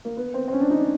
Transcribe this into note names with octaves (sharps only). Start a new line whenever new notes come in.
A#3
B3
C4
C4
C#4
D4
D#4
D4